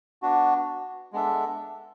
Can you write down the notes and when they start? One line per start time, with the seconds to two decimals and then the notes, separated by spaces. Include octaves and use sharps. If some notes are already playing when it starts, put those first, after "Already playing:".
0.22 B3 D4 F#4
1.13 G#3 B3 D4 A4 E5